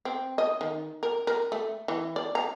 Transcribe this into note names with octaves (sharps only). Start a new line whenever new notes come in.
C4
D#5
D#3
A#4
A#4
A3
E3
D5
A#5